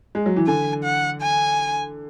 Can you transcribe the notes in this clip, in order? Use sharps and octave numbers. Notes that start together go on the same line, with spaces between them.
G#3
F#3
E3
D3 G#5
F#5
G#5